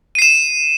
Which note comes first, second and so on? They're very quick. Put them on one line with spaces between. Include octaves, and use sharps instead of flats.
D#7 C7 E7